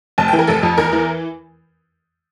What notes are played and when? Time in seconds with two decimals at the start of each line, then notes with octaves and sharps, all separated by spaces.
0.18 F1 A5
0.28 E3 G5
0.39 A#4
0.47 F1 A4
0.63 F2
0.78 E2 A#4
0.93 E3